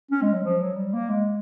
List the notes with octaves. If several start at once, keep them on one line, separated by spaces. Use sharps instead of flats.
C#4
G#3
F#3
F3
F#3
G3
A#3
G#3